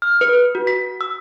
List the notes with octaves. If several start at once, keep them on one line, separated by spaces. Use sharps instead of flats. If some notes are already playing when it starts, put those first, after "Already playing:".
F6
B4
F#4
B6
E6